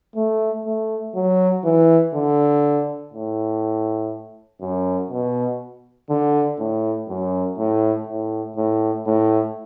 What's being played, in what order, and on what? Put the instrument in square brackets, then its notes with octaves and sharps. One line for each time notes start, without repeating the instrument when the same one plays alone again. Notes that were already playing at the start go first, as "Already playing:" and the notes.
[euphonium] A3
A3
F#3
E3
D3
A2
F#2
B2
D3
A2
F#2
A2
A2
A2
A2